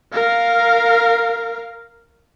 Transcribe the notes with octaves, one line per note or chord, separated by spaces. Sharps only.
A#4 F5